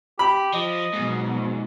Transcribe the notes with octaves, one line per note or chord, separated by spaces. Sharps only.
G4 B5
F3 D#5
F2 G#2 B2 F#3